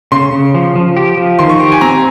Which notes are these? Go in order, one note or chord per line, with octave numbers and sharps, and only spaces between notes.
C#3 C6
C#3
F3
F3
G4
F3
D#3 C6
C#6
G4 C6
G#5
C4 A#5